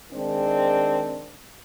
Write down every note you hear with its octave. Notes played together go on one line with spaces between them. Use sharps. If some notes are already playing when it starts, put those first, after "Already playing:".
D#3 G#3 C4 D4